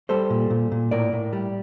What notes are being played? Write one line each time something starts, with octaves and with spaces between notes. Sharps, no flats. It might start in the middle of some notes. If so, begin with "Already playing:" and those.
G3 A4 C5
A#2
A#2
A#2
A2 A#4 D5
A2
G3